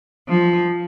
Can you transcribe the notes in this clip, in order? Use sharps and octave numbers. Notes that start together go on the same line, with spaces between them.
F3